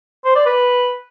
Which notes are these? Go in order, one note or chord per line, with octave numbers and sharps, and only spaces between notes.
C5
D5
B4